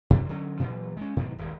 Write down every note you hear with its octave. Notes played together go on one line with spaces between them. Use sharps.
F#2 C3
D3 F#3 C#4
A#2 E3 F#3
G#3 C#4
G#2 B2 D#3 F#3
D#1 G#1